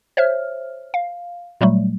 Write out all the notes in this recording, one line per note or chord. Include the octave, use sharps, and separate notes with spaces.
C5 C#5 E5 F6
F5
A#2 F#3 G3 A3